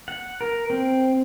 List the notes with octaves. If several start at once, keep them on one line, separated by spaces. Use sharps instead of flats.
F#5
A#4
C4